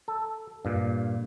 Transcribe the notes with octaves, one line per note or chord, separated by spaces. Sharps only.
A4
G2 A#2